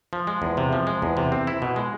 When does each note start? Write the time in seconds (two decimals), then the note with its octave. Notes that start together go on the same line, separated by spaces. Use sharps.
0.13 F3
0.27 G#3
0.42 E2
0.57 C3
0.72 F3
0.87 G#3
1.02 E2
1.17 C3
1.32 C4
1.47 E4
1.62 B2
1.76 G#3